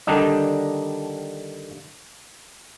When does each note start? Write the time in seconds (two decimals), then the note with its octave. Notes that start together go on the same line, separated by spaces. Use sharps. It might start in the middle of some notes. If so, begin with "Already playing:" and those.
0.07 D3 D#3 G3 D4 D#4